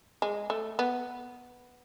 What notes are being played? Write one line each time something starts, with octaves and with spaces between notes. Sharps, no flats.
G#3
A3
B3